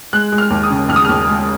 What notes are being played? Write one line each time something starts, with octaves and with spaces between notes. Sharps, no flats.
G#3 F#6
G#3
F6
D#2
D#6
C#3
D#2 F6
D#6
D#2 F6
G#3